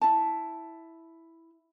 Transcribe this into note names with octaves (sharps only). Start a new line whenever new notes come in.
E4 A5